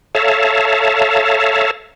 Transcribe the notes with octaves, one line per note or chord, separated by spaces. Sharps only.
A4 C#5 E5 F5 A5 A#5